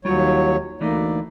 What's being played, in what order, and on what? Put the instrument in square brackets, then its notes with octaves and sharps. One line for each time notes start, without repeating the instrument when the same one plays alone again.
[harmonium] D#2 F#3 C#5 [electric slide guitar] G3 F4 F#4
[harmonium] D2 A#3 D5 [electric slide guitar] E3 A3 D#4